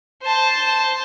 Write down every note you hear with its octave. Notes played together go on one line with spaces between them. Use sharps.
C5 A5